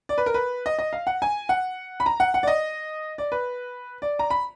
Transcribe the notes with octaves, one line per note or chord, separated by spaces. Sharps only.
D5
B4
A#4
B4
D#5
D#5
F5
F#5
G#5
F#5
B5
A#5
F#5
F#5
D5
D#5
D5
B4
D5
A#5
B5